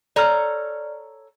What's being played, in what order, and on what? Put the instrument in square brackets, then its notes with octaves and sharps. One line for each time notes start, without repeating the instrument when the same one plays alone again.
[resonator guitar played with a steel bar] A4 C#5 A#5 [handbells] D5 F6